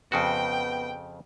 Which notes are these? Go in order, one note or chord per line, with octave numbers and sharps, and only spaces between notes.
F2 C#3 B3 F#4 G5